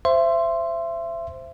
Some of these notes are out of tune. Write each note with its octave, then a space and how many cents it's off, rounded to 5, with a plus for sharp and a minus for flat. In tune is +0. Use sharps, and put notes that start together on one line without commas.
C5 +0 E5 +30 C6 +0